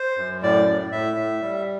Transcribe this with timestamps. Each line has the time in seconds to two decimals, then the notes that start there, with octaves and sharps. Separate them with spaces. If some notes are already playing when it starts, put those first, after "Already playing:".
Already playing: C5
0.17 F#2
0.43 A2 D5
0.67 A2
0.92 A2 E5
1.16 A2
1.42 G3